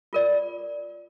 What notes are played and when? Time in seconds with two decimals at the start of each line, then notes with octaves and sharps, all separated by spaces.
0.13 F4 A#4 D5